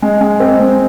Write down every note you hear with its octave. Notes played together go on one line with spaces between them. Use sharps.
G#3
G#3
C4
G#3